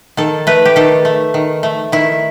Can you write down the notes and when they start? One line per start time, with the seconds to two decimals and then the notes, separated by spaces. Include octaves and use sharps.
0.17 D#3 A4
0.47 A3 B4
0.65 G4
0.76 D#3 A4
1.05 A3
1.34 D#3
1.63 A3
1.92 D#3 E4